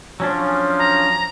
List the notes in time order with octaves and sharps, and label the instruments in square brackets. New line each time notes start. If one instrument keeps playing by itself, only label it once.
[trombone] F3 [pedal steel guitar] F#3 C#4 D4
[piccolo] A#5